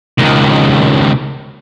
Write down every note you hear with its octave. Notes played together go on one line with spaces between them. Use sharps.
C#2 D#3